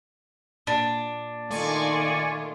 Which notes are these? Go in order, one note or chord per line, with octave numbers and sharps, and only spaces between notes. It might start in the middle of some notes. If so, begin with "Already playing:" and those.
A#2 D4
D#3 A3 F4 D5 G#5 C#6